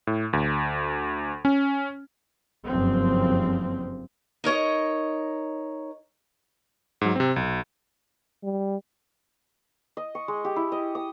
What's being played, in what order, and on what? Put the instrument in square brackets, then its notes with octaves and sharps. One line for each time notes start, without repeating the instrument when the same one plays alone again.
[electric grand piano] A2
D2
C#4
[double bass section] F#1 G2 F3 C4
[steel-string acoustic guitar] D#4 A#4 C#5 D#5
[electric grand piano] G#2 F#3
C3 C4
B1
[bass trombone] G3
[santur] D#5
C#6
G#3
G4
E4
D#5
D#6